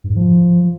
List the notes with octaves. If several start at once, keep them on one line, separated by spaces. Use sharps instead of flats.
G2
G#2
F3